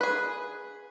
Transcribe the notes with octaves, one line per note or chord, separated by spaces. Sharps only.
G#4 B4